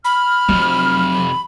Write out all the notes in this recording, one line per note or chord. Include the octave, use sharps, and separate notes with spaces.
B5 F6
F2 C3 F#3